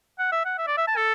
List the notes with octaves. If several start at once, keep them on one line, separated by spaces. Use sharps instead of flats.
F#5
E5
F#5
E5
D5
E5
A5
A4